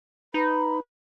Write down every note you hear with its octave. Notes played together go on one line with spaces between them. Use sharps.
D#4 B4 B5